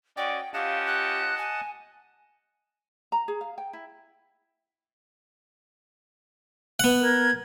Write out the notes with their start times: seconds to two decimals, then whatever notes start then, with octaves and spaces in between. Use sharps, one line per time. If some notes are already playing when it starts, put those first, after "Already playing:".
0.17 C#4 F#4 D5 D#5 G5
0.54 C#4 F4 G4 D#5 F5 F#5 A5
0.86 F#6
1.38 G#5
3.12 A#5
3.28 G#4
3.41 F5
3.58 G5
3.73 E4
6.79 B3 F#5
7.01 A#4 G#6